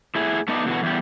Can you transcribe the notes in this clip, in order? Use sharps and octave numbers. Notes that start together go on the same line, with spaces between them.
A2 E4 G#4
A3 B3 D#4 A4 D5 D#5
B2 D3 E3 F#4
E2 G3